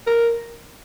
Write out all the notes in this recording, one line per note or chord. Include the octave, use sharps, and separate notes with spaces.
A#4